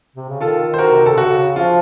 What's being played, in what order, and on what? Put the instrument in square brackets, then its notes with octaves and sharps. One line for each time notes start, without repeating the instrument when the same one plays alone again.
[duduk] C3
C#3
[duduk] D#3 [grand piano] F4 A4
[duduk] D#3
[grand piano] C5
F#4 A#4
[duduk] C3
[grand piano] A4
[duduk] C3
[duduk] C#3 [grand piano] F#4
[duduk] F3 [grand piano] F4